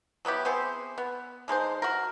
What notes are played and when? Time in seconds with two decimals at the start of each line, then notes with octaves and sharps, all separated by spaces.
0.25 F#3 B3 E4 G4
0.45 B3 C4 G#4 C5
0.98 B3
1.48 D3 G#3 D#4 C5
1.82 F#4 A#4